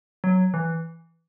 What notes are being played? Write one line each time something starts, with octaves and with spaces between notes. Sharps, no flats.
F#3
E3